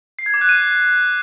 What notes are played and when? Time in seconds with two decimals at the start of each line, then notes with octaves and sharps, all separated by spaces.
0.19 C7
0.26 G#6
0.34 D6
0.41 F#6
0.49 D#7